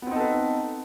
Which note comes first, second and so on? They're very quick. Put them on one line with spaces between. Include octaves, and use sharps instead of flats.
B3 C4 D#4 A4 B4